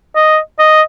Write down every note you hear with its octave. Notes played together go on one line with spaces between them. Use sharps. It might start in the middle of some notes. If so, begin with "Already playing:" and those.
D#5
D#5